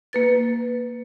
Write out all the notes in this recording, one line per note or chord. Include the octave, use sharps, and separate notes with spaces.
A#3 B4 A6